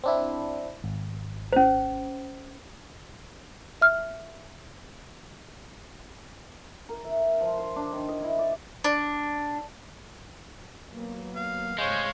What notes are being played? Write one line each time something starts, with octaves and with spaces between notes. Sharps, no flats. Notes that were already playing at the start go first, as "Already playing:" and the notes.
C4 D4 E4
G#1
C#4 C5
E5 F6
A#4
E5
A#4
F3
C6
D4
D#3
D#5
E4
D5
D4
F#3 A#3 B3
F5
G1 C3 G#3 A3 C5 C#5 F5